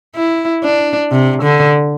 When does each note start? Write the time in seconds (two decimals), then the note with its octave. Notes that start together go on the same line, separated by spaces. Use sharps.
0.16 E4
0.63 D4
1.11 C3
1.42 D3